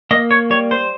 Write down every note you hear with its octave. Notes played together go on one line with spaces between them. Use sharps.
A#3 D#5
C#5
G3 C#5
C5